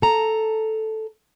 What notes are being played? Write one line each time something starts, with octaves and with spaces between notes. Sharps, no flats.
A4 A#5